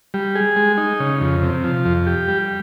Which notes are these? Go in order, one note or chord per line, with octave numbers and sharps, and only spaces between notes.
G3
G#4
G#3
D#4
C#3
F2
C3
F3
F2
G4
G3